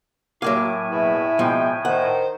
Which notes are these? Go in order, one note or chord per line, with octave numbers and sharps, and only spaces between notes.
A2 F#3 A#3 F5 G#5 D6
E2 B2 E4
B2 F3 G#3 E5 G5
D#3 C5 F#5